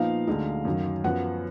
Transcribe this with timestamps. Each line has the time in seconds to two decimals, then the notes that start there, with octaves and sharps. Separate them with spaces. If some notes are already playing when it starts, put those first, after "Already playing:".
Already playing: A#2 F3 B3 D#4 F5
0.27 D2 D3 G#3 D#4
0.65 F#2 D#3 F#3
1.04 F#2 F3 B3 F#5